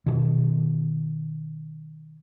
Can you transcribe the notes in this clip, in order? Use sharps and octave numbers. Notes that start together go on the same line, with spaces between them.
B2 D#3